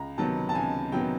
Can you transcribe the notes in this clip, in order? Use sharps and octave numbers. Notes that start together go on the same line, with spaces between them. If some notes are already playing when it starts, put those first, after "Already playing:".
Already playing: C#2 A#5
C3 D#3 F#3 B3 A5
A5
C#2 G#5
C3 D#3 F#3 B3 G5